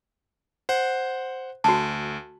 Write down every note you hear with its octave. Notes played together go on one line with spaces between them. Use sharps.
C5 F#5
D2 F#4 A5